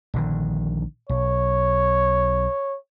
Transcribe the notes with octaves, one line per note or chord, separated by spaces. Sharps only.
A#1 D3 D#3
B1 C#5